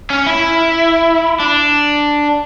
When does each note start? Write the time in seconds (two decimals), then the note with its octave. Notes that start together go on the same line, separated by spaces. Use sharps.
0.10 C#4
0.26 E4
1.40 D4